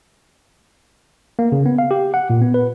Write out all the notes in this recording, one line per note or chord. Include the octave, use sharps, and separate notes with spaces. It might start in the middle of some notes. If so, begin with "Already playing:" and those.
A#3
C#3
B3
F5
G4
F#5
A#2
B3
B4